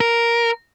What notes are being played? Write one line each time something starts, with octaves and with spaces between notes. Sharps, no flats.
A#4